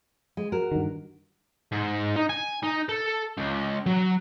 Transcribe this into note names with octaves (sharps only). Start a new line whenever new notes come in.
G#3
F#4 A#4
G2 D#3
G#2
D#4
G#5
D#4
A4
C#2
F#3